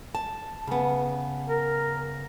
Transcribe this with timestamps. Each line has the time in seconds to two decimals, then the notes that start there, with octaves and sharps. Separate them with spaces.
0.15 A5
0.67 C#3 B3
1.48 A#4